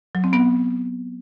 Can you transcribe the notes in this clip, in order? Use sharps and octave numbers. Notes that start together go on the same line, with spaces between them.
F#3
C4
B3